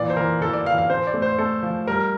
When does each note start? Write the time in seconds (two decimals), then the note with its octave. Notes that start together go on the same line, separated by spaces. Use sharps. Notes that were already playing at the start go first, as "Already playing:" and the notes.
Already playing: A#2 E3 D5
0.10 C5
0.17 E3 A#4
0.41 E3 A4
0.53 D5
0.66 E3 F5
0.78 F5
0.90 C4 C5
1.07 D5
1.14 A3
1.22 C5
1.39 A3 A4
1.63 F3
1.87 G3 A#4